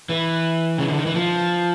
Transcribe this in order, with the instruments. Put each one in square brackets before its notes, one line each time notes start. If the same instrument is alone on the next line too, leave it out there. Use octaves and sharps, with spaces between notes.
[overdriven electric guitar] E3
C#3
D3
D#3
E3
F3